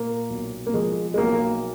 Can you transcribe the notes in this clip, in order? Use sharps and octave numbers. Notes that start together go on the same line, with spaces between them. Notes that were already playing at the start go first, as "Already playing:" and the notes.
Already playing: A#2 A#3
B1
A#3
F3 G#3
G#3
B1 A#3